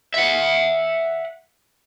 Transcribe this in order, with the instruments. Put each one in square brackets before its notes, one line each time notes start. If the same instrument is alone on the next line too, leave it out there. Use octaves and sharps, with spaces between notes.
[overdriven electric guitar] E5 F#5